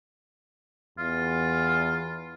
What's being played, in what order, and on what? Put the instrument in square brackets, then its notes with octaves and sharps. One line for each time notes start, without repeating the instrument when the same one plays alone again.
[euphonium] E2 [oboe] F4